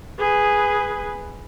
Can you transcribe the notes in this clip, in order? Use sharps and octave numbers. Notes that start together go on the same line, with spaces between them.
G#4 B4